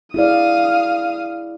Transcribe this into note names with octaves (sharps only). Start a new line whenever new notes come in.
E4 G#4 D5 F5 D#6